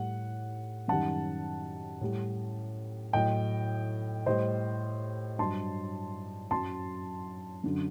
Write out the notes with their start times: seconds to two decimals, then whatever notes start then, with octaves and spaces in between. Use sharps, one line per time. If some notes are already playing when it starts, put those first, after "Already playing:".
Already playing: A2 G3 F#5
0.88 F#2 D#3 G3 F#5 A5
2.01 A2 G3
3.13 A2 F#3 D#5 G5
4.26 A2 G3 C5 D#5
5.38 G2 F#3 A5 C6
6.51 F#2 F#3 A5 C6
7.64 F#2 D3 F#3